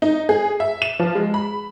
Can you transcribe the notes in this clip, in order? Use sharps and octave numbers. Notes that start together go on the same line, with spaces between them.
D#4
G#4
E5
E7
F3
G#3
B5